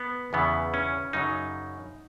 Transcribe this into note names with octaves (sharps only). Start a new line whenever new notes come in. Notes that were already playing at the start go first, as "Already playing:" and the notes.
Already playing: B3
E2 C#3 E3 B3
C#4
F#2 C#3 F#3 D#4